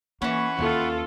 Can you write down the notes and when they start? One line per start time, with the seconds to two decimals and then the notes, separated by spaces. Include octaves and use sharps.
0.22 E3 A#3 C#4 F#5 B5 C#6
0.59 D#2 F4 A4